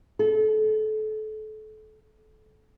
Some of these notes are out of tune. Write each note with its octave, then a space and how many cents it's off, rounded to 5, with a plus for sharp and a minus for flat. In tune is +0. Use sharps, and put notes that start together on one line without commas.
A4 -30